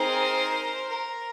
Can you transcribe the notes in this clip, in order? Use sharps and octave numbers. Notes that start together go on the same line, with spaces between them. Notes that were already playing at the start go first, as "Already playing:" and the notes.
Already playing: C4 D#4 G#4 A#4 C5
A#4